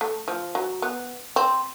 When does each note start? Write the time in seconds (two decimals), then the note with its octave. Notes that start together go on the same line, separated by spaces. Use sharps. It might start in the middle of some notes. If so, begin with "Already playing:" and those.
0.01 A3
0.28 F3
0.55 F#3
0.82 B3
1.36 C4